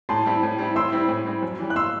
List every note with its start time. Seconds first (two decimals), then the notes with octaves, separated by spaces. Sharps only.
0.09 A2 A5 C6
0.26 G3 C4 E4
0.43 A2
0.59 G3 C4 E4
0.76 A2 C6 E6
0.92 G3 C4 E4
1.09 A2
1.26 G3 C4 E4
1.43 F#2
1.59 E3 G3
1.70 F#6
1.76 C6 E6